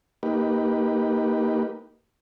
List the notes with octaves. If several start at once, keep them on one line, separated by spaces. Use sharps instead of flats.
A#3 D#4 G4 B4